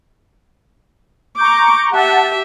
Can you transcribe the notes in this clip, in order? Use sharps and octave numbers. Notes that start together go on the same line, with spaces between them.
A#5 C#6 D6 G6
G4 E5 F#5 A5